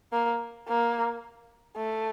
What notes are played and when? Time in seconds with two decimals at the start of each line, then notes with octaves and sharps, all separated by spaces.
0.12 A#3
0.68 A#3
1.77 A3